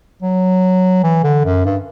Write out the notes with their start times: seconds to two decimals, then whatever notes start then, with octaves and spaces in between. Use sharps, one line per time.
0.22 F#3
1.04 E3
1.23 D3
1.45 F#2
1.65 G2